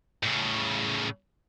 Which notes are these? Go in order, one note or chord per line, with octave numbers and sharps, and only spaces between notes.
A2 C#3